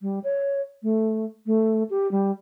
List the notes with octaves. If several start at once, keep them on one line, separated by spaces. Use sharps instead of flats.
G3
C#5
A3
A3
G4
G3